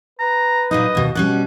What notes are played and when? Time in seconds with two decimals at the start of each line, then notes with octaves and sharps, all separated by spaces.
0.19 B4 A#5
0.71 A#2 F#3 D#4 D#5
0.95 D#2 B2
1.15 B2 G3 C#4 D5 F#5